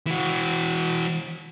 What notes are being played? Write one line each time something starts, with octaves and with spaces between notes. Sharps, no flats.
E3 F#4